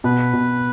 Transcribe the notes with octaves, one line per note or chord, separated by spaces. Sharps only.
B2 B4
B2